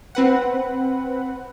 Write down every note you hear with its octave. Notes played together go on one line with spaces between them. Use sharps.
C4 B4 F#5